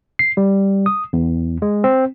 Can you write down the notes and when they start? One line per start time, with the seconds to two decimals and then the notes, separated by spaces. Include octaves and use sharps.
0.19 C7
0.37 G3
0.86 D#6
1.13 E2
1.62 G#3
1.84 C4